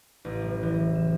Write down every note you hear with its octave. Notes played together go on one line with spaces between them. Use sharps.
A1
F#1
E3
E7